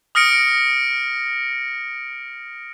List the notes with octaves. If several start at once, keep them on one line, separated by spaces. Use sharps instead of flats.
D#6 F6 A#6 C#7 D7